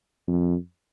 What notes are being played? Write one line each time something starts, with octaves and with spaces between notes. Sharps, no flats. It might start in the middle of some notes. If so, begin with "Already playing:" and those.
F2